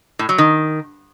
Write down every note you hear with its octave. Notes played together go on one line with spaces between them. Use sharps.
A2
F#3
D#3